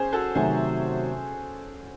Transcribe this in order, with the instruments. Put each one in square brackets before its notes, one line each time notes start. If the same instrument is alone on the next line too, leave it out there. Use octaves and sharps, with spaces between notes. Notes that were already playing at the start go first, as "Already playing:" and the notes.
Already playing: [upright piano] C#4 G#4 C5
F#4 A4
[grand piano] C3 D#3 F#3 A3 [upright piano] G#4 C5